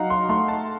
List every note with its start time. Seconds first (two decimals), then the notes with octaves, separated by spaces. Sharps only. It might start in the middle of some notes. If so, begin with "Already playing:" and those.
Already playing: F#3 D#4 F5 F#5 A#5
0.10 C6
0.29 A3 C6
0.48 A5